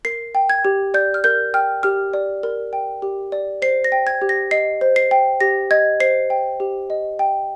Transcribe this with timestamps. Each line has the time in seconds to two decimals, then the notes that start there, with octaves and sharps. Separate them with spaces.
0.05 A#4 C7
0.35 G5
0.50 G#6
0.65 G4
0.94 D5 G6
1.14 F6
1.24 A#4 G6
1.54 G5 F6
1.83 G4 F6
2.14 D5
2.43 A#4
2.73 G5
3.02 G4
3.32 D5
3.62 C5 C7
3.84 A#6
3.92 G5
4.07 G#6
4.22 G4
4.29 A#6
4.51 D#5 C7
4.81 C5
4.96 C7
5.11 G5
5.41 G4 A#6
5.71 D#5 G#6
6.00 C5 C7
6.30 G5
6.60 G4
6.90 D#5
7.19 G5